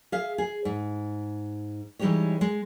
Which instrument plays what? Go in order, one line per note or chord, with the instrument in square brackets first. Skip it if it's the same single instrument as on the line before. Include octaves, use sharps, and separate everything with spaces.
[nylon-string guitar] G#4 E5 F5
G#4
G#2
E3 G3 G#3 D#4 G4 C#5
G#3